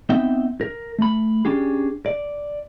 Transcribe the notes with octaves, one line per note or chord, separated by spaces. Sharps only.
B3 C4 D#4 E5 G5
A#4
A3 B5
C#4 D4 G4 G#4
D5